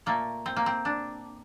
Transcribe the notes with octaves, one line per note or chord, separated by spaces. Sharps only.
A#2 A3 A#3
C4
A#3
C4
D4